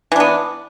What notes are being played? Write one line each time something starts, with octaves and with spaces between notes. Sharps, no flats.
E3 B3 D4